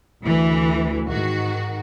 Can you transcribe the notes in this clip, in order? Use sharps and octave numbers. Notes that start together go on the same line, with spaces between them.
D2 E3
G#2 D#3 F#4